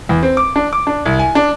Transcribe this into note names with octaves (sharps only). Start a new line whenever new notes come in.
E2
C4
D6
D4
D6
D4
C2
G#5
D4